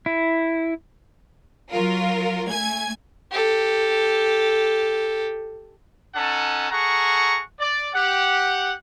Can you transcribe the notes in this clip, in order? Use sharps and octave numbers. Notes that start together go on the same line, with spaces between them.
E4
F#3 F4 A#4
A3 G#5 G#6
G4 A4
C#4 D#4 A4 F#5 A5
G#4 A4 F#5 A#5 C#6
D5
G4 F#5